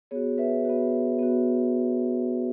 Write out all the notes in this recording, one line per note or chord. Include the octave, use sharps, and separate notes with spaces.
B3 F#4 G#4 C#5
B4 E5
B3 F#4
B3 F#4